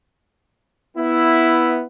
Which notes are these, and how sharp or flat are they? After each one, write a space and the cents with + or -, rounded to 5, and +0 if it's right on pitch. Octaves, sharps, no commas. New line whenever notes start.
B3 +0 E4 +0